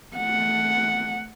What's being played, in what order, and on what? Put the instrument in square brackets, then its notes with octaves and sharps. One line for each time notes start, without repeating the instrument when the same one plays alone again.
[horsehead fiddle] A3 F#5